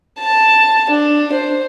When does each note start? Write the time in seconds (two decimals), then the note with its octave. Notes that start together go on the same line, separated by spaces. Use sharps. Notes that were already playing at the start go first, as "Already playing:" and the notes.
0.19 A5
0.89 D4
1.32 C5